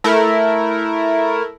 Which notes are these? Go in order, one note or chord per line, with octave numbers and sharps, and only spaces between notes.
A3 E4 A#4